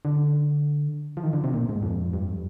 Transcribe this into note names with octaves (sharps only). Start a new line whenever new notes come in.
D3
F3
D#3
D3
C3
A#2
G#2
F2
G2
F2